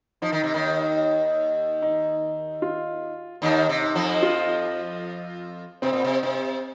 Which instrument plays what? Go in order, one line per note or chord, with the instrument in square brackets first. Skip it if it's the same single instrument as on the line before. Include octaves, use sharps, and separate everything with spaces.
[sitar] F3 [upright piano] D#4
[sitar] D#3
C3
D#2 D#3
[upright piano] D#4
F4
[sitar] D#2 D#3 [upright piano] D#4
[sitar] C3
[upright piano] D#4
[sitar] F2 F3
[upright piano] F4
[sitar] C3 [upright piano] C4
[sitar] A#2
C3
[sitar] C3 [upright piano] C4